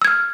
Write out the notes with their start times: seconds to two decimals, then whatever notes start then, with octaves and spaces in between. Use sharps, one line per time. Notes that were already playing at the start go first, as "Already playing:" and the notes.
0.02 E6
0.05 G#6
0.08 F6